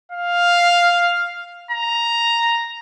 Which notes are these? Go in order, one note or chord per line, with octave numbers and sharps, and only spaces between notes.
F5
A#5